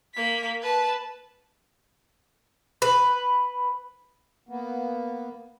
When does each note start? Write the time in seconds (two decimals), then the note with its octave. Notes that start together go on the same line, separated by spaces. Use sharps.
0.15 A#3 B6
0.61 B4 A5
2.82 B4
4.49 A#3 B3